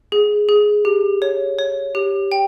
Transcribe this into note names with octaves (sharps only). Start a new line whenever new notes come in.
G#4
G#4
G4
C#5
C#5
G4
G5